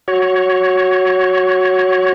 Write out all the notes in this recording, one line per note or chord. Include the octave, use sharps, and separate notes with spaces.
F#4 C#5